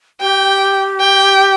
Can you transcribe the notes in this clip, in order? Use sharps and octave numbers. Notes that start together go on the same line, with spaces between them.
G4 G5
G5